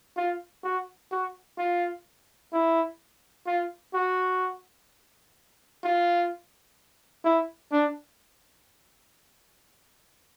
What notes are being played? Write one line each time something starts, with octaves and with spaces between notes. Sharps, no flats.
F4
F#4
F#4
F4
E4
F4
F#4
F4
E4
D4